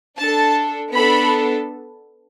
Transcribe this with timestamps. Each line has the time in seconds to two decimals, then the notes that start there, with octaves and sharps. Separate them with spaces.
0.19 D4 A4 A5
0.93 B3 D4 A4 B5